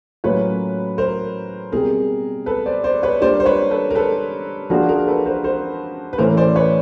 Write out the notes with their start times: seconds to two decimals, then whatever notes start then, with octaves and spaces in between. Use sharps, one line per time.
0.24 A2 F#3 A#3 C#4 F4 B4 C#5
0.98 A#4 C5
1.72 B2 G3 C4 G#4 A#4
2.46 A4 B4
2.66 C5 D5
2.84 C5 D5
3.03 B4 C#5
3.21 G3 A#3 D4 F4 C5 D5
3.40 C5
3.46 B4 C#5
3.71 A4 B4
3.91 A#4
3.95 A4 B4
4.70 F3 A#3 D4 F#4 G#4 A#4
4.89 G#4 A#4
5.07 A4 B4
5.26 A#4 C5
5.44 A#4 C5
6.13 B4
6.18 A2 E3 A3 C#4 A#4 C5
6.37 C5 D5
6.56 B4 C#5